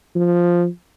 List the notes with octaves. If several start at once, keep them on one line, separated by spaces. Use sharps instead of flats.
F3